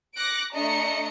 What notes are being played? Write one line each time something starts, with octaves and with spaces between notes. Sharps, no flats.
D6 F#6 A#6 C#7 D7
A3 D4 D#5 A#5 C#7